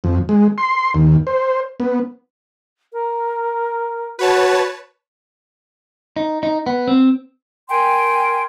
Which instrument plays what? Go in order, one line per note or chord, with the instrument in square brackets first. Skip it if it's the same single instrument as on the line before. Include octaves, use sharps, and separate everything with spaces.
[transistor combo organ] F2
G#3
C6
D#2
C5
B3
[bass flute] A#4
[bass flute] F#4 [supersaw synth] B4 C#5 A5
[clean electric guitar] D#4
D#4
B3
C4
[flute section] A#4 G5 G#5 C6